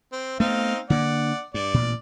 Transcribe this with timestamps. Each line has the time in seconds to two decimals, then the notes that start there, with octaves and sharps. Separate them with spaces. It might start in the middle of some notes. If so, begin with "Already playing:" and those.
0.12 C4
0.40 A3 B3 C4 D#4 F5
0.90 D3 A#3 D5 F#5
1.54 G2 D5
1.74 A1 A#2